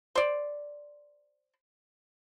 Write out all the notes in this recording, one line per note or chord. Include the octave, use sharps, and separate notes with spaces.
C5 D5